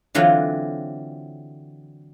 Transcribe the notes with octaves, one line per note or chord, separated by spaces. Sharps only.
D3 E3 F#3 C4 F4